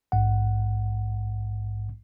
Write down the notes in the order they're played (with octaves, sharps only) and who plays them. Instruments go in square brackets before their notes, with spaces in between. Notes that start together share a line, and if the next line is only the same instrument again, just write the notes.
[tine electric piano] A#1 G#2 F#5